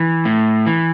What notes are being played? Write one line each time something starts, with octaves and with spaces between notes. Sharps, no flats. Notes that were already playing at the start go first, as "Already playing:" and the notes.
Already playing: E3
A2
E3